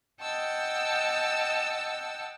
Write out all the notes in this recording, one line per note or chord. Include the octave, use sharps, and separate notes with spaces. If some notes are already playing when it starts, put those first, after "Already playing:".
D#5 F#5 G5 A5 E6